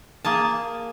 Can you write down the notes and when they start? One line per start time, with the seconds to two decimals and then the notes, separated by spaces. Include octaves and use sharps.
0.25 A#3 G#4 A5